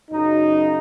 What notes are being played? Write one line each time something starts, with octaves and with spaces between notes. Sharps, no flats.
F#2 C#3 F#3 D#4